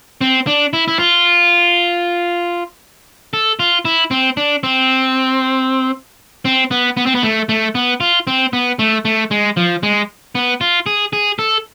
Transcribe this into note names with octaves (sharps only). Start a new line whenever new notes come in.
C4
D4
E4
E4
F4
A4
F4
E4
C4
D4
C4
C4
B3
B3
C4
B3
A3
A3
B3
F4
C4
B3
A3
A3
G#3
F3
G#3
B3
F4
G#4
G#4
A4